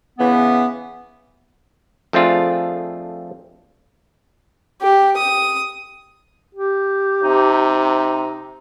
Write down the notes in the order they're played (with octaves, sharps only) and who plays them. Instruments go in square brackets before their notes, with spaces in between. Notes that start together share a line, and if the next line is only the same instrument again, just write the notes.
[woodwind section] C#3 E3 B3
[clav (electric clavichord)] F2 A3 C4 D4 F4 G#4
[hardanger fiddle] G4
D#6
[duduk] G4
[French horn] C3 [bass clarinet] D#4